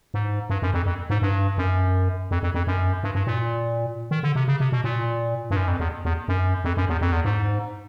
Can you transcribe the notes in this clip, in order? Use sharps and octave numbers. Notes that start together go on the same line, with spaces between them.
G#2
G2
F#2
F2
F2
G#2
G2
F#2
F2
F2
F2
F#2
G2
G2
A#2
D#3
D3
C3
C#3
C3
B2
A#2
G2
F#2
F2
E2
E2
F#2
F2
F#2
E2
F2
E2
G#2